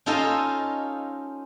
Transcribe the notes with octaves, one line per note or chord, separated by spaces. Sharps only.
C#4 D#4 F4 A4 C5 D#5